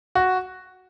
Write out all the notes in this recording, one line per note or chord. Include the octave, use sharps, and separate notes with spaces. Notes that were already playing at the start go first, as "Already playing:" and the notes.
F#4